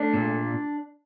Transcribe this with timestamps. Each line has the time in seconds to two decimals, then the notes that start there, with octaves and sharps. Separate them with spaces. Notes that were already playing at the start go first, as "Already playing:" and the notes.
Already playing: A3 D4
0.14 A#2